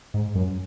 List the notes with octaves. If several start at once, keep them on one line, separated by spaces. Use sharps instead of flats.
G#2
F#2